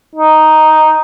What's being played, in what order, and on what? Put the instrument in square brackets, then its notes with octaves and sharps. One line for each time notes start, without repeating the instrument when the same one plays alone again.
[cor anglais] D#4